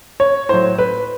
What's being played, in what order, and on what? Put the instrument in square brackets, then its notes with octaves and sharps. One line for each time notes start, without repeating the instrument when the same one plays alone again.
[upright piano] C#5
A2 F#3 C5
B4